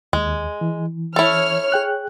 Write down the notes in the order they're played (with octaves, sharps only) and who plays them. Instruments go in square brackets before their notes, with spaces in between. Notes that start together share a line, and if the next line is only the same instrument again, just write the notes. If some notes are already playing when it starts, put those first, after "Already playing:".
[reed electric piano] D#2 [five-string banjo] G#3
[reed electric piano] E3
[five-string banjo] E4 A4 [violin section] C#5 F6
[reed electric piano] G#4 G5 F#6